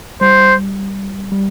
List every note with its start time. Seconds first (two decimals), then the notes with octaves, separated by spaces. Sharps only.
0.21 G3 C5
1.32 G3